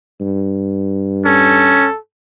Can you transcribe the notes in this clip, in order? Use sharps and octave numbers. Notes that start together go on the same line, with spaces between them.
G2
C#4 A4